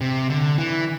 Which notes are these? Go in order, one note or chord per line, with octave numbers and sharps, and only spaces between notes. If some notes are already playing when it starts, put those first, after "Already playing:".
C3
D3
E3